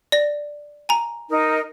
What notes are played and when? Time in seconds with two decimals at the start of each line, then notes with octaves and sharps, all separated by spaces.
0.12 D5 A#6
0.89 G#5 A#5
1.29 D#4 A#4